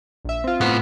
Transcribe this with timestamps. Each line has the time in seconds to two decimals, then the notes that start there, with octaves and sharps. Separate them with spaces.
0.25 A#1 E5
0.44 C4 F4
0.61 A2 B3 C5